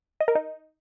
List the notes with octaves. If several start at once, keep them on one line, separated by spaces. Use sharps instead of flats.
D#5
A#4
D#4